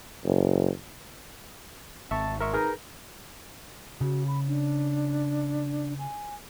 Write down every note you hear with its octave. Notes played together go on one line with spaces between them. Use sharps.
F#1
G#1 E5 A5 C#6
G#3 A#4 E5 C#6
D#4 G#4 A#4 B4
C#3 F#4
B5
D4
G#5